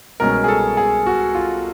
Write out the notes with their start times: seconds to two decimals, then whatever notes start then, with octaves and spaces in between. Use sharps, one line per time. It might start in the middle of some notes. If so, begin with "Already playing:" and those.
0.20 C2 B2 G#3 C#4 A#4
0.44 G#4
0.48 A4
0.77 G#4
1.06 F#4
1.35 F4